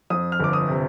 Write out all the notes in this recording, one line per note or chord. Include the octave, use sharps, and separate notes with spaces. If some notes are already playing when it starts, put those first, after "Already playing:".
F2 D#6
F6
G1 D6
D#6
C3